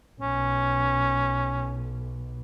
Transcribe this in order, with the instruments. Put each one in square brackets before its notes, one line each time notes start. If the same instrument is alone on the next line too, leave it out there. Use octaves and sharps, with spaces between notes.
[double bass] B1 [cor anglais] C#4